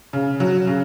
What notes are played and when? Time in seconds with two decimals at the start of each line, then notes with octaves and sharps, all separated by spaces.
0.13 C#3
0.40 F#3
0.67 C#3